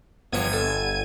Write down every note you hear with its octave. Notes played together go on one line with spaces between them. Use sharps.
G1 E2 C3 F3 G#6 D#7
A4